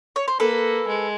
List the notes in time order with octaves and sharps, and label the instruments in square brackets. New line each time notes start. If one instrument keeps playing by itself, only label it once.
[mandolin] C#5
C5
[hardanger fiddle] A#3 [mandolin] A4 B4
[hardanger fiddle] G#3